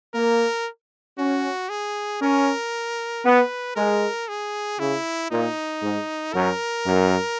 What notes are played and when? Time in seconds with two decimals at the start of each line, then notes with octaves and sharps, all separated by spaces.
0.14 A#3 A#4
1.18 C#4 F#4
1.69 G#4
2.21 C#4 A#4
3.24 B3 B4
3.75 G#3 A#4
4.28 G#4
4.79 C#3 E4
5.31 A#2 D#4
5.82 G#2
6.34 F#2 A#4
6.86 F#2